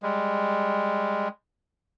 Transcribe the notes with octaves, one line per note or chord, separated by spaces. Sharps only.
G3 G#3